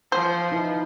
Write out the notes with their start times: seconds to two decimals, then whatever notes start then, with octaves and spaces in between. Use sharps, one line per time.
0.12 F3 C5
0.52 D#4 E4 B4